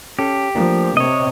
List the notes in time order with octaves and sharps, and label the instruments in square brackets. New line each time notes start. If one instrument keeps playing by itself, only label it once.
[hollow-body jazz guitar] C#4 A4 [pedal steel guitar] G4
[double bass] F3 [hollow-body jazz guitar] A3 A#3 D4
[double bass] C3 [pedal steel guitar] C#5 D#5